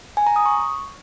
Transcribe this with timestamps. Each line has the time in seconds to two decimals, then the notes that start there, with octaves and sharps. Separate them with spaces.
0.17 G#5
0.27 A#5
0.36 D#6
0.46 C#6